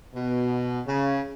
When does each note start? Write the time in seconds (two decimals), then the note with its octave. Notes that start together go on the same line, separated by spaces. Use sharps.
0.14 B2
0.86 C#3